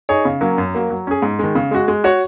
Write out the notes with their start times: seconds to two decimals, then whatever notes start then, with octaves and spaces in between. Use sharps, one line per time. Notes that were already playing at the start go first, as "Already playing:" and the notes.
0.09 D#4 G#4 C#5
0.25 C#3
0.41 F#3 A#3 C#4
0.58 F#2
0.74 F#3 A#3
0.90 F#3
1.07 C#4 G#4
1.22 G#2
1.39 D#3 G#3
1.55 C#3
1.71 G#3 F#4
1.88 G#3
2.04 F#4 C#5